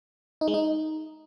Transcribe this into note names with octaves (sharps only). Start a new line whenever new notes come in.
D#4
G#3
D#4